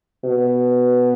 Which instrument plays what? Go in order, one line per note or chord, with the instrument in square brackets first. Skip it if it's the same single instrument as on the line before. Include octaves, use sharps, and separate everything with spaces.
[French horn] B2